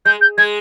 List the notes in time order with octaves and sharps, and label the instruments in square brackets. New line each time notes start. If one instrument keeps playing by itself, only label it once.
[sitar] G#3 [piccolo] G6
[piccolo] G6
[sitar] G#3 [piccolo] G#6